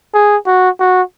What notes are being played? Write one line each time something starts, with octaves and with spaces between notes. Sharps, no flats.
G#4
F#4
F#4